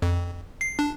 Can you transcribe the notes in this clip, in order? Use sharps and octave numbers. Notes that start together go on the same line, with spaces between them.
F2
C7
D4